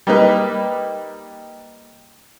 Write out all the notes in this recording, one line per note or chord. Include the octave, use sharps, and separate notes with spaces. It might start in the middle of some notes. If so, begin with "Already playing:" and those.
G3 A#3 D#4 B4